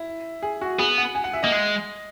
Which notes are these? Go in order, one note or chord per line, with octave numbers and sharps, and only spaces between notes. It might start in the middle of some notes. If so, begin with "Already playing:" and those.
Already playing: E4
G#4
F#4
B3 G#4
F#5
G#5
F#5
E5
A#3 D#5
G#3